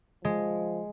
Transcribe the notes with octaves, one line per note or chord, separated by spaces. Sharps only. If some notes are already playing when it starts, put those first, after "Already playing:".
F3 G#3